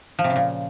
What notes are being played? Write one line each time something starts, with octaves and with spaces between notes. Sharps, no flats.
F3
C3
C#3
A#2